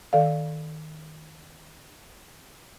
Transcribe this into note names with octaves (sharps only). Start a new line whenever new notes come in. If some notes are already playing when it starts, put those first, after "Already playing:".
D#3 A4 D5 F5